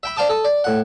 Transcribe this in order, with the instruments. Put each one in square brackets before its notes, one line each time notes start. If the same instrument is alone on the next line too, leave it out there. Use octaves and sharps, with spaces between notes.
[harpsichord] E5 G5 B5
C5 D5 F5 G5 A5 D#6
A4 D#6
D5
A2 F#5